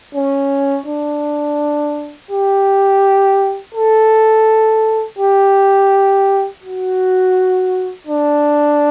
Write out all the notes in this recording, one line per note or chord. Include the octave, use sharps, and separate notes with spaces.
C#4
D4
G4
A4
G4
F#4
D4